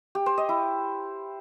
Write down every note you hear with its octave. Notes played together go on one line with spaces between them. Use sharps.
G4
C5
D#5
E4